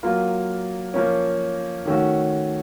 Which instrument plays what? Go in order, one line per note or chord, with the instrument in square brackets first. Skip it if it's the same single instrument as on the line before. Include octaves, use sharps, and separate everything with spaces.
[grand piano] F#3 A#3 F4
F3 A#3 C#4
D#3 A3 C#4 F#4